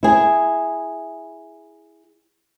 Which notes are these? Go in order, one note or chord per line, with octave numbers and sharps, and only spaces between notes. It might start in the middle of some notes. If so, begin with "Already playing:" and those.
E4 G#4